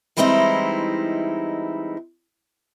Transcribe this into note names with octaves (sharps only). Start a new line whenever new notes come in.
E3 G3 G#3 C4 D#4 E4